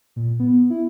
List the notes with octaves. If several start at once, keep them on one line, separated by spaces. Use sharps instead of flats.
A#2
B3
E4